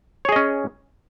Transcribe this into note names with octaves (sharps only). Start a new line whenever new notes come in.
C#4 G#4 C#5 D#5